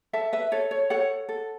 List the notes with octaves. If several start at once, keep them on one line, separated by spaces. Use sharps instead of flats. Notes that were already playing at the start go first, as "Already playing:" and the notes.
A4 E5 A5
B4 E5
A4 C#5
C#5
A4 C#5 F#5
A4